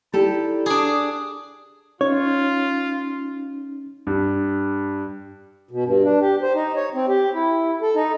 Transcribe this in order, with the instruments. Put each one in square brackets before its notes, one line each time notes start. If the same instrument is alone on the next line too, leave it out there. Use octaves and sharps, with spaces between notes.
[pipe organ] D#4 E4 D5 [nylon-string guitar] G4 A4
[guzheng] D4 G#4 [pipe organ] D6 D#6
[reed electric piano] C#4 D#4 [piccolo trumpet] F4 [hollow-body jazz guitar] C#5
[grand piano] G2
[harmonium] B2
G2
D4
G4
C5
D#4
C#5
C4
G4
E4
A4
D#4